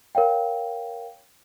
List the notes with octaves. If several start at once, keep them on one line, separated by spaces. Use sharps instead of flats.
A#4 C#5 F5 G5